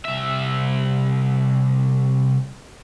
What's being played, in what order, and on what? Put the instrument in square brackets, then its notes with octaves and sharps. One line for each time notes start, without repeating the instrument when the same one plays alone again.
[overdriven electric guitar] C2 E5